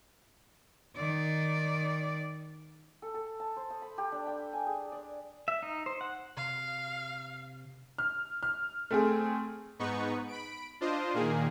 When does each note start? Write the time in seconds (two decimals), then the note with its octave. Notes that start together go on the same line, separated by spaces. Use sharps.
0.96 D#3 D5
3.02 A4
3.14 A4
3.40 A5
3.56 C5
3.70 D#6
3.82 B5
3.98 G4
4.12 D4
4.27 G5
4.53 G#5
4.67 G#4
4.92 D5
5.48 E5
5.63 D#4
5.86 C5
6.01 F#5
6.37 C3 F5
7.98 F6
8.43 F6
8.91 A3 C4 G#4
9.79 G#2 B3 D#4 B4 C#6
10.28 B5 D7
10.81 D4 F4 C5 D#5
11.14 A#2 D#3 A#3 G#4